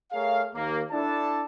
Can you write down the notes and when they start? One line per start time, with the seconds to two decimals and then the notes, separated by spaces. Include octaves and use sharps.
0.13 A3 G#4 A#4 C#5 F5
0.55 D#2 A#3
0.91 D4 E4 A4 A5